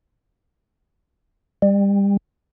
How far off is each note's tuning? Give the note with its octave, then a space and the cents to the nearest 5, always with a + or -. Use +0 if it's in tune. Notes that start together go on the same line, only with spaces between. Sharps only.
G3 +30